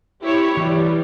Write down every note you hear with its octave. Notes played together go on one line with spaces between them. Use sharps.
E4 G4 C#5
E3 G3